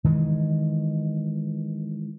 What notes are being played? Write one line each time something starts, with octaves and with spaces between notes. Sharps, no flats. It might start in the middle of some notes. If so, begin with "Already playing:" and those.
D#3 E3 G#3